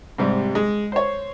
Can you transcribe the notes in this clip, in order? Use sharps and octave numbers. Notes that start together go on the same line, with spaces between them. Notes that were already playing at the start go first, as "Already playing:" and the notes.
G#2 C3 G3
G#3
C5 C#5